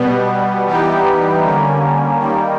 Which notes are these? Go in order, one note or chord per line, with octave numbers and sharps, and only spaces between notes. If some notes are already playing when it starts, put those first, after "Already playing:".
Already playing: B2 G3 B3
E3 G3 B3 D#4 G4
D3 G3 A#3 C#4
D#3 G3 A#3